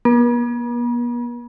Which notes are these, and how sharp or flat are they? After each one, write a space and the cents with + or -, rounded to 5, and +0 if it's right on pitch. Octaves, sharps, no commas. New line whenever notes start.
B3 -45